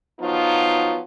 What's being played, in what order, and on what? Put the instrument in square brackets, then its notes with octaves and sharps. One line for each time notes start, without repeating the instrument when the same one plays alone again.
[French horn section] F3 F#3 B3 D#4 F4